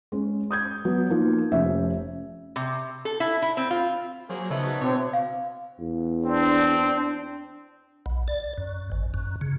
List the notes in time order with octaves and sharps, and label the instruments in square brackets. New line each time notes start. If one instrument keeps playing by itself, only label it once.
[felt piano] G#3 C#4
D#6 G6 G#6
F#3 B3
F3 A#3 D#4 F4
F1 C#4 E5
[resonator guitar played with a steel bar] C3
A4
E4
E4
C4
F4
[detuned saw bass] F#3 [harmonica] A#3 G#4 [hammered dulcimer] C5
[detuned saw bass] C#3 [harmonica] B3 D#4 B4 [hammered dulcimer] C#5 E5 A5
[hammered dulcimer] F#4
[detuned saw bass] B2 [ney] C4 [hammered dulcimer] D4 E4 F#4 [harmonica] C#5
[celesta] F5
[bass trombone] E2
[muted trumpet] C4 [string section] D4
[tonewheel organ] B1
D5
F#2
G#1
F#2
C#3